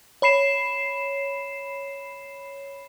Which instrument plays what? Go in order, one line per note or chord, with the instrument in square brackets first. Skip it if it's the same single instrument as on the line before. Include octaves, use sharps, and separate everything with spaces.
[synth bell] C#5 B5 C7 E7